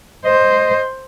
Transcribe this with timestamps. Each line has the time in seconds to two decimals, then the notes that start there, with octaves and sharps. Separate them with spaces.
0.25 C5 D#5